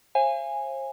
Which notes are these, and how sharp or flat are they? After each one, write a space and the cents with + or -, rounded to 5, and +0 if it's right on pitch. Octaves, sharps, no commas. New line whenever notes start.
C5 +40 F5 -40 G#5 -10